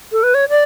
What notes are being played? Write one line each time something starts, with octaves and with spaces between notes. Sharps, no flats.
A4
B4
C#5
D5